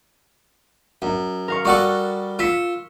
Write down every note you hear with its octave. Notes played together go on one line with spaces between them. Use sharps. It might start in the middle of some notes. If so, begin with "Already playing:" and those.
F#2
A#4 F5 C#6
G3 F#4 A4 C#6 D#6 F#6
F4 E6 B6 C#7